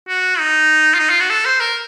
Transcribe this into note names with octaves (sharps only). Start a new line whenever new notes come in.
F#4
D#4
F4
D#4
F4
F#4
A4
C5
A#4